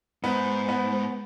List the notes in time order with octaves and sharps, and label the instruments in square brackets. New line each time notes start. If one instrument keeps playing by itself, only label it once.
[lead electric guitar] G#2 [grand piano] B3
[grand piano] B3